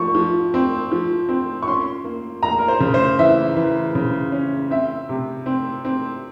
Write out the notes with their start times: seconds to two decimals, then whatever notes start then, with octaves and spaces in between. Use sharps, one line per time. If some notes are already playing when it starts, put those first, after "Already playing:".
Already playing: F3 C#6
0.15 F3
0.54 C4
0.92 F3
1.29 C4
1.62 C#6
1.68 C#4 C6
2.04 A#3
2.43 A#3 A#5
2.59 A#4
2.68 C5
2.80 C#3
2.94 C5
3.19 E3 E5
3.56 E3
3.95 C#3
4.32 C#4
4.70 C4 E5
5.09 C3
5.46 C4
5.85 C4